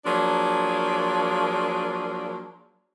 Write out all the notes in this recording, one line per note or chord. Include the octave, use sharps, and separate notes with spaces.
F3 F#3 A#3 D4 G#4